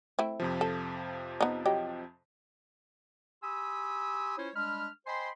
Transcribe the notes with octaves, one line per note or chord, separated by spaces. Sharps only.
A3 C4 E4
F2 C3 F3
A4
B3 D#4
F#3 D#4 G4
G4 G#5 B5 C6 D#6 E6
C#4 E4 F4 C5 C#5
G3 G#3 D4 B5 F6
C5 D#5 G5 G#5 B5 C6